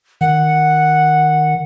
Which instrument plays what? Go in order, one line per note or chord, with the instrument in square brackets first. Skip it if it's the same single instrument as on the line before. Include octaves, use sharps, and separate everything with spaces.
[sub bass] D#3 [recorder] F#5